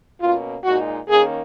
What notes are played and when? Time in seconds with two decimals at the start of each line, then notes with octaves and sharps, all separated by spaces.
0.21 B2 A#3 C#4 F4
0.64 A#2 G#3 D#4 F#4
1.09 D#3 A#3 C#4 G#4